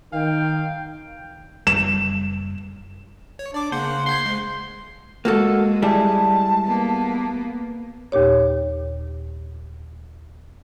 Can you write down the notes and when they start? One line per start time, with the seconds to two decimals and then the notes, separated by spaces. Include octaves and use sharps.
0.13 D#3 F5 G5
1.67 F#1 C#2 G3 E7
3.39 C#5
3.54 D4 D5 D6
3.72 C#3 A#3 C5 F#5
4.07 F#5 C6 G6 G#6
4.26 G#3
5.25 G#3 A#3 F#4 A4
5.82 G3 E4 G#4 A5
6.66 A#3 B3
8.12 D#2 A#2 G4 C#5